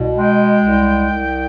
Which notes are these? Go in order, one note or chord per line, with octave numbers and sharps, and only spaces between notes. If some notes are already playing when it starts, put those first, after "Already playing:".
Already playing: C2 B2
G#3 G5
C2
C2